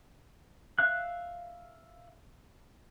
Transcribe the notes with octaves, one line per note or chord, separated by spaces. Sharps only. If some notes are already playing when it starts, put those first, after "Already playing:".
E5 F5 F#6